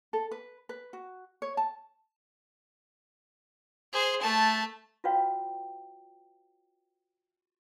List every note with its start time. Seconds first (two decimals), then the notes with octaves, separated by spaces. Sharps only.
0.13 A4
0.31 B4
0.69 B4
0.93 F#4
1.42 C#5
1.57 A5
3.93 G#4 C5
4.21 A3 A5
5.04 F4 F#4 B4 C#5 F5 G5